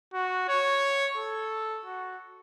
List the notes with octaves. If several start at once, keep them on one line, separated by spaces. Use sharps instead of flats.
F#4
C#5
A4
F#4